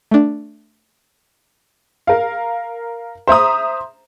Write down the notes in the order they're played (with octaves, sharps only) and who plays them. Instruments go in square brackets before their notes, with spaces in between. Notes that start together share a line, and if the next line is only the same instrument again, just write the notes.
[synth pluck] A3 D4
[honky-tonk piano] A#4 F5
C5 E5 A#5 D#6